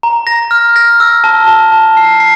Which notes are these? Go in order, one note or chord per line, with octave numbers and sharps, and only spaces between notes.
A#5
A#6
F6
A#6
E6
A5
A5
A5
C7
C7